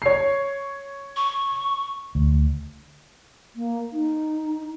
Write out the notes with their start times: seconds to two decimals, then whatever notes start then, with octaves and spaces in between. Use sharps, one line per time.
0.02 C#5 C7
1.16 C#6
2.15 D2
3.56 A#3
3.93 D#4